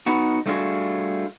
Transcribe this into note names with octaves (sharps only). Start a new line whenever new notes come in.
B3 D#4 F#4
G3 A3 D4 F4 F#4 G#4